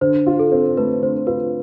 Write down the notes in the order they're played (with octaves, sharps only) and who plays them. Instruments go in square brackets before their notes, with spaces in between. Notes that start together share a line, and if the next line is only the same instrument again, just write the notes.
[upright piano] D3 [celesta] C5
[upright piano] F4
[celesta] A4
[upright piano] C4
[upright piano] A3 [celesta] B4
[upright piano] D3 [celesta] C5
[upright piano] F4 [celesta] B4